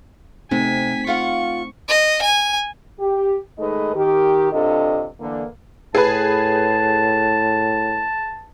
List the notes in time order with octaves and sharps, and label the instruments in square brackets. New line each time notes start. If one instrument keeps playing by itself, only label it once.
[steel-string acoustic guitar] C3 [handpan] A3 C4 D#4 [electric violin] G#5 B6
[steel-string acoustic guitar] F4 F5 F#5 [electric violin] C#6
[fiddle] D#5
G#5
[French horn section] G4
D#3 G#3 A3 D#4 B4 D#5
D#3 G4
G2 C3 D4 F4 A4 D#5
D3 E3 A#3
[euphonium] A2 [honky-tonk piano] G#4 B4 [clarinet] A5